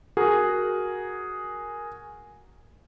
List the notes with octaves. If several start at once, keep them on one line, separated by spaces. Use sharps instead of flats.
F#4 G#4 A#4